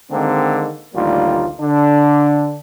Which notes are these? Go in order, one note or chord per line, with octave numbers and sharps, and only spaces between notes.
D3 D#3 G#3 A#3 C4
A1 D2 D#3 G3 A#3 F4
D3 D4